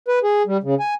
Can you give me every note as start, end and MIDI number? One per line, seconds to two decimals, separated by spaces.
0.08 0.19 71
0.23 0.43 68
0.47 0.57 55
0.63 0.75 49
0.80 0.94 80